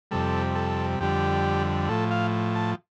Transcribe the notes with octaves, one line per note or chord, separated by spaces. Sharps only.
F2 C3 G3 A4
A4
F2 D3 G3 G4
A2 F3 A4
F5
A5